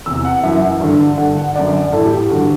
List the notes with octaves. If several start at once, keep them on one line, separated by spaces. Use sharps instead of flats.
E2 C3 E3 E6
F#5
F#2 E3 E5
G2 D3
G2 D3 F#5
F#5
F#2 D3 D5
A2 E3 A4
G4
G4
G2 D3 F#4